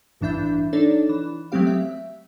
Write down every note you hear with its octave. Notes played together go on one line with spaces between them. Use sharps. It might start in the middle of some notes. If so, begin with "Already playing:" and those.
A1 G2 E3 D4 E5 G6
D4 D#4 A4 C#5 D5
E3
F#3 G#3 A3 C4 G4 F5
E5